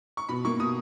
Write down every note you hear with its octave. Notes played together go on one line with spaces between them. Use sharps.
C#6
B2 B5
A#3 C#6
B2 D#6